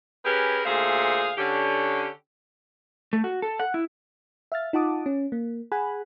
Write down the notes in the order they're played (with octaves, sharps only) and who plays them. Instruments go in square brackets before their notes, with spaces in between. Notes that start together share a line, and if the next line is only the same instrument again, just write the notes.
[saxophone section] C#4 G4 G#4 A#4 B4
D2 A#2 A3 G#4 C5 F5
D3 C#4 G4
[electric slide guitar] A3
F#4
A4
F#5
E4
[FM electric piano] E5 F5 F6 A6
D#4 F4 F#5 A5 D6 D#6
C#4
A#3
G#4 F#5 G#5 B5 F#6